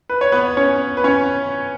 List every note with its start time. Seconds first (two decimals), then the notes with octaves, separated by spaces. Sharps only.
0.10 B4
0.21 C#5
0.32 B3 B4
0.57 C#4 C#5
0.97 B4
1.04 C#4 C#5